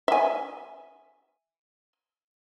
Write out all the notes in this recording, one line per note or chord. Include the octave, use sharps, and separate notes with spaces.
E5 G#5